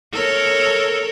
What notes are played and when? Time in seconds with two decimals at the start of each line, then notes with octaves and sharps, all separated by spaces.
0.13 A4 A#4 C#5